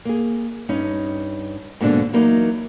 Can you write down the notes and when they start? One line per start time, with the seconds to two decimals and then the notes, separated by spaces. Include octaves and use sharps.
0.05 A#3 G#4
0.69 G2 C#4 D#4
1.81 G#2 B2 D3 A#3 C4 D4
2.13 E3 F#3 A#3 D#4